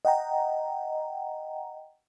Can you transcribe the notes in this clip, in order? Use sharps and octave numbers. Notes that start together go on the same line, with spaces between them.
D#5 F#5 G5 A#5